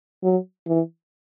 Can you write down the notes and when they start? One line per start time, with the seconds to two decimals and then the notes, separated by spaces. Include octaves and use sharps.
0.23 F#3
0.67 E3